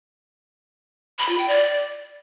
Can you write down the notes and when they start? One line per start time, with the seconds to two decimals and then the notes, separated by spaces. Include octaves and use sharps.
1.19 B5
1.29 F4
1.38 G5
1.48 D5